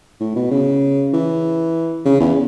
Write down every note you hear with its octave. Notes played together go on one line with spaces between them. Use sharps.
A2
B2
C#3
E3
C#3
E2